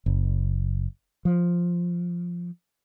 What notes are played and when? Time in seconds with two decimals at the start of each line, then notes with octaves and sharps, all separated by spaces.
0.06 F#1
1.25 F3